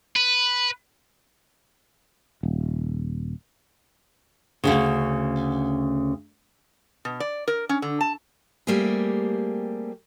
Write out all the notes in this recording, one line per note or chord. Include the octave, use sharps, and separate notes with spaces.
B4
D#1
D2 G2 C#3
B2
D5
A#4
C#4
D3
A5
G3 A3 A#3 C4 G4 G#4